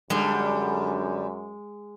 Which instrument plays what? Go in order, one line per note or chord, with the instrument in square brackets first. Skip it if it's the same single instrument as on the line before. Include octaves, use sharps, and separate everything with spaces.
[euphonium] F#2 [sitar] D3 G3 [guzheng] G#3